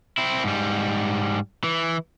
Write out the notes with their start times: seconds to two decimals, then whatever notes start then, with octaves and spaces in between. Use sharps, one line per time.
0.18 C4 E4
0.44 G#2 G3
1.64 E3